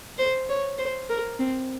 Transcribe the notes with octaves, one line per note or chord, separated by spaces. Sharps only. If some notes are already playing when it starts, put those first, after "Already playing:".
C5
C#5
C5
A#4
C4